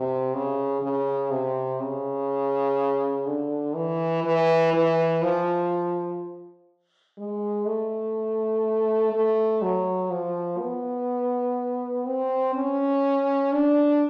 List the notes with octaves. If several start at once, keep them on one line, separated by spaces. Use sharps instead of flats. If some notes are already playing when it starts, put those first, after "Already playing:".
Already playing: C3
C#3
C#3
C3
C#3
D3
E3
E3
E3
F3
G#3
A3
A3
F#3
F3
B3
C4
C#4
D4